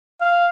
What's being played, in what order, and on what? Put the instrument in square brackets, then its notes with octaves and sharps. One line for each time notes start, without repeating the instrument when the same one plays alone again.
[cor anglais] F5